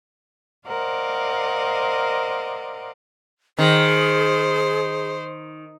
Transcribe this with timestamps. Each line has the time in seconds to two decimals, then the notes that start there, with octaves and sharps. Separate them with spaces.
0.67 A#4 C5 D5 D#5 F5 F#5
3.59 D#3 G#4 C5